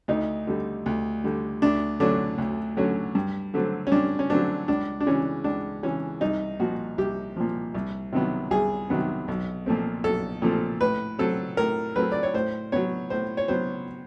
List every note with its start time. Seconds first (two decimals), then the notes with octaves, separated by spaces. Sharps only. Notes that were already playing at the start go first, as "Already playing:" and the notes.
0.08 D2 D#4
0.47 D3 G3
0.86 D2
1.24 D3 G3
1.62 D2 D4
2.00 D3 F#3 A3 C#4 D4
2.38 D2
2.77 D3 F#3 A3 C#4
3.15 G2
3.54 D3 F#3 A3 C4
3.87 C#4
3.92 G2 D4
4.19 C#4
4.30 D3 F#3 A3 C4 D4
4.68 C#2 D4
5.00 D4
5.06 C#3 E3 C#4
5.44 C#2 D4
5.83 C#3 E3 C#4
6.21 C2 D#4
6.60 A#2 F3 F#4
6.98 C2 G4
7.36 A#2 F3
7.75 C2
8.13 C3 D#3 F#3 B3
8.51 C2 G#4
8.90 C3 D#3 F#3 B3
9.28 B1
9.66 A#2 F3 A3 C4
10.04 B1 A4
10.42 A#2 F3 A3 C4
10.81 A2 B4
11.19 F#3 A3 C4 A4
11.57 A2 A#4
11.96 F#3 A3 C4 B4
12.12 D5
12.23 C#5
12.34 A2 C5
12.72 F#3 B3 C#5
13.10 A2 C5
13.37 C#5
13.48 F#3 B3 C5